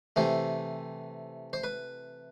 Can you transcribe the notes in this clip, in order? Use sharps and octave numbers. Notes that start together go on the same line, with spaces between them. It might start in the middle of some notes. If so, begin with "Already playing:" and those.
C3 E3 A3 C5
C5
B4